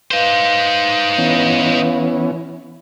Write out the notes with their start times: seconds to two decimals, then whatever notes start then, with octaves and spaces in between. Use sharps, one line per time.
0.11 D#4 B4 C5 F5
1.18 E3 B3 C#4